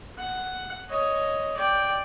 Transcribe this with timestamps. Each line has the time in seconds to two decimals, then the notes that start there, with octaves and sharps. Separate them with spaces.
0.19 F#5
0.90 C#5 D#5
1.56 D5 G5